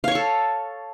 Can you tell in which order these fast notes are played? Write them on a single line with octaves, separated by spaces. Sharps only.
F5 C#5 C#6 A4